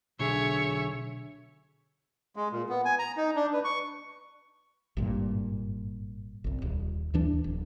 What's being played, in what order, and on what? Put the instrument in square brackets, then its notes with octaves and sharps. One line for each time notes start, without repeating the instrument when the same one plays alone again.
[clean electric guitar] B1 D3 G#4 [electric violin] C#5 E5
[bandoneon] G#3
A#2
B3
G#5
A#5
D#4
D4
B4
C#6
[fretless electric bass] G#1 G2 A#2
G1 C2
D#1
D#2 E3 D4
D1